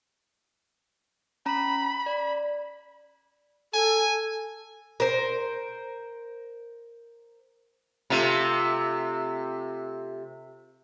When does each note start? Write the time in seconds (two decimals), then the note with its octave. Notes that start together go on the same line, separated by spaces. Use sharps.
1.46 C#4 A#5 B5
2.06 D5
3.74 A4 G#5
5.00 A#4 C5
8.10 C3 A3 F4